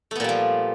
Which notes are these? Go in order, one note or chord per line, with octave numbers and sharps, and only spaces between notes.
A#2 F3 G3 A3 B3